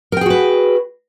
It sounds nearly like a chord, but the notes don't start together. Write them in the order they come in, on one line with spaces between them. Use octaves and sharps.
A#4 G5 G#4 F#4 B4